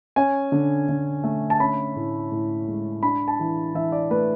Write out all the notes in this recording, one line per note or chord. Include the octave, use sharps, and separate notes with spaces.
C#4 G#5
D3
D3
A3
A5
C#4 B5
A2
A2
G#3
D4 B5
A5
E3
E3 E5
D5
A3 B4